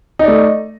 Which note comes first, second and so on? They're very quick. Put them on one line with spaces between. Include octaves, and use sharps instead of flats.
D#4 D5 A3